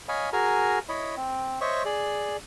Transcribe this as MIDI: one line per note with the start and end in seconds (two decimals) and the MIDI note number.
0.09 0.30 73
0.09 0.30 75
0.09 0.30 77
0.09 0.30 80
0.09 0.30 83
0.33 0.79 66
0.33 0.79 68
0.33 0.79 70
0.33 0.79 80
0.33 0.79 82
0.89 1.15 64
0.89 1.15 73
0.89 1.15 75
0.89 1.15 83
1.17 1.59 60
1.61 1.83 72
1.61 1.83 73
1.61 1.83 75
1.61 1.83 76
1.61 1.83 85
1.85 2.37 68
1.85 2.37 74